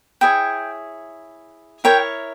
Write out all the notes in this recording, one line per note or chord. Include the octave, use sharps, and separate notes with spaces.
E4 G#4 C#5 G5
E4 A#4 C#5 G5